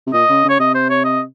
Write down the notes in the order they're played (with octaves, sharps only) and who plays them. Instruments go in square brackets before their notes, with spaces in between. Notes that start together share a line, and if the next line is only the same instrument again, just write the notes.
[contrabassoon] C3
[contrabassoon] A#2 [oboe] D#5
[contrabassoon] C#3
[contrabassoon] C#3 [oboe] C#5
[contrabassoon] C3 [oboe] D#5
[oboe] C5
C#5
D#5